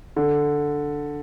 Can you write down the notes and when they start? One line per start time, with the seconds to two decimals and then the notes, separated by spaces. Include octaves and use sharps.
0.16 D3